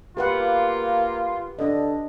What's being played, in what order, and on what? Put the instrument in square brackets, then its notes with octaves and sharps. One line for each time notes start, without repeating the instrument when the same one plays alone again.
[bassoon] A#3 [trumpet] F4 [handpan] G4 B4 F#5
[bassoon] D3 [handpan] D4 D#5